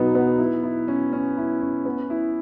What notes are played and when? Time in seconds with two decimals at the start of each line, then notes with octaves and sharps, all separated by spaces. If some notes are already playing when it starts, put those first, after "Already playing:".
Already playing: B2 F#3 B3 D#4
0.15 B3
0.39 E4
0.63 E4
0.88 C#4
1.13 C#4
1.37 E4
1.62 C#4
1.85 B3
2.10 E4